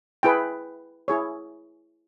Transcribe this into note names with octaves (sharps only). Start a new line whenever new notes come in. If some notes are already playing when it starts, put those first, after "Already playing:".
E4 G#4 B4 G5
E4 G#4 C#5